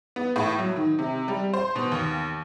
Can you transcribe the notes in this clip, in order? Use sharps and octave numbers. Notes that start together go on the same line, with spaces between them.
B3
A2
F#3
D#3
C3
G3
C5
B2
D#2